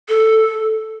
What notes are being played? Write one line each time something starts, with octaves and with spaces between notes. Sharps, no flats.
A4